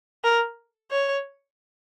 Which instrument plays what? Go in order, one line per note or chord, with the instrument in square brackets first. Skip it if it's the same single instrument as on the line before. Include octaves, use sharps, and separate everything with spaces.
[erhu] A#4
C#5